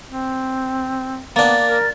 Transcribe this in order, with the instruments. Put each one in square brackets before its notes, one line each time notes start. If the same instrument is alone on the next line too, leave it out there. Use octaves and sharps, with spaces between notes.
[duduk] C4
[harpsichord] A#3 D4 [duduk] B3 [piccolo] A6
[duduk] A#4